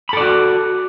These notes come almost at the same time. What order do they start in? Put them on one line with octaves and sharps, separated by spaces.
B5 A4 D5 F#4